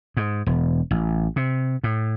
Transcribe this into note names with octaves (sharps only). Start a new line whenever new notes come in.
G#2
E1
A1
C3
A2